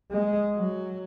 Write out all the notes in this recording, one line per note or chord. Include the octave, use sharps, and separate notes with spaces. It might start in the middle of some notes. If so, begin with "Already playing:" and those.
G#3
F#3